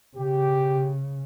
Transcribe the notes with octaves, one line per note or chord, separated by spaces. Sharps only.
C#3 G4